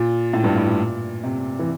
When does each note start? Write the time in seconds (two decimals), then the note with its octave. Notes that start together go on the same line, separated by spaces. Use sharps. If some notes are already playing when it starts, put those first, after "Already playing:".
Already playing: A#2
0.33 A2
0.44 G2
0.56 A2
0.66 A#2
1.23 C3
1.59 E3